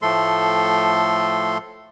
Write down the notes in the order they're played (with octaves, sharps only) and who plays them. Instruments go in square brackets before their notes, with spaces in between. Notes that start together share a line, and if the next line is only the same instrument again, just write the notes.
[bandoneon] A2 F3 A3 A4 C6